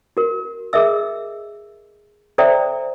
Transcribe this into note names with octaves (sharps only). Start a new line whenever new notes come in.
F#4 A#4
G#4 A#4 D#5 E5 E6
A4 C5 D5 E5 G5 A#5